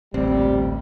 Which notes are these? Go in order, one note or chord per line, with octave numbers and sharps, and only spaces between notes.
A1 D2 A#2 G3 C4